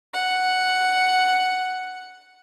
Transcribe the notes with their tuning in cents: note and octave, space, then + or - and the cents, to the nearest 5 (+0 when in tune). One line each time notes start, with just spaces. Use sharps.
F#5 +0